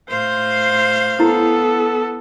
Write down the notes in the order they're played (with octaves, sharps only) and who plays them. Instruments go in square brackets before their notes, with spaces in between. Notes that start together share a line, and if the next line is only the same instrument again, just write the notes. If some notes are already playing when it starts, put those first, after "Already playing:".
[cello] A2 F5 [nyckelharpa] C5
[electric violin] B3 A4 [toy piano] E4